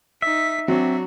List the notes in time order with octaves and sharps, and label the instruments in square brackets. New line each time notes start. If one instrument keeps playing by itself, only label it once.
[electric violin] D#4 B6 [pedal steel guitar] E5
[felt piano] F#3 [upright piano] C4 [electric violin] D4 F#4